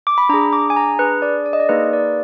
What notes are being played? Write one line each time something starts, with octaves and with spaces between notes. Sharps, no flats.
D6
B5
D4 G#4 A#5
D6
G#5
A#5
D4 G#4 B4
D5
D5
D#5
D5
A#3 D#4 G#4 B4
B4
D5